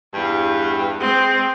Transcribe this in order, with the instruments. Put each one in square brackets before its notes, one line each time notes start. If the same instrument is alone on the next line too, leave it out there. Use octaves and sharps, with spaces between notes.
[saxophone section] E2 G2
[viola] G#3 C4